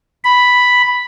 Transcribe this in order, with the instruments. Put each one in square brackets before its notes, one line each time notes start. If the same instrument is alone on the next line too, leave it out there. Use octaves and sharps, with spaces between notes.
[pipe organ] B5